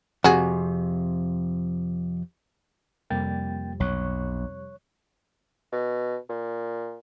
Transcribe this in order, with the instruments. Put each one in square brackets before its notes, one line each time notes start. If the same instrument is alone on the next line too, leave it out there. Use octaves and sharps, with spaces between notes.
[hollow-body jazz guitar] F2 C3 [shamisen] F#4 G#4
[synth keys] F2 C3 G3 [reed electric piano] A#3 G5 A6
[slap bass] B1 [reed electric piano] C#5 C#6 F#6
[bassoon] B2
A#2